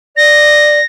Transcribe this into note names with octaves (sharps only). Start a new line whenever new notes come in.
D5 A#6